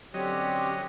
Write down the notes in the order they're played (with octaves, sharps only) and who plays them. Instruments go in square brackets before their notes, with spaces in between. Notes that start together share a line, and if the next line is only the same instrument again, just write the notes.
[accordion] D3 C#4 G4 [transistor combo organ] F#3 D#5 [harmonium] C4